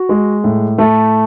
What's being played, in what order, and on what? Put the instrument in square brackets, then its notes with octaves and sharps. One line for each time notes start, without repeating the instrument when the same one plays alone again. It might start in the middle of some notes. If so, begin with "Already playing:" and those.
Already playing: [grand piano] F#4
G#3
A2
A3